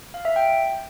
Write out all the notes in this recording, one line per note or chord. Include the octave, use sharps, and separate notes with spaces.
F5
E5
G5